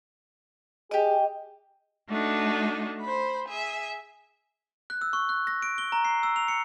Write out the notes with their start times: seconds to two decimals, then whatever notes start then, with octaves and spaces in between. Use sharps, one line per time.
0.91 G4 G#4 D#5 D6
2.08 A3 D4 D#4 F#4
3.02 C5 B5
3.48 G#4 E5
4.90 F#6
5.01 E6
5.13 C#6
5.29 F#6
5.47 A#6
5.62 D7
5.78 G7
5.92 A#5
6.05 C7
6.23 E6
6.36 F7
6.48 C#7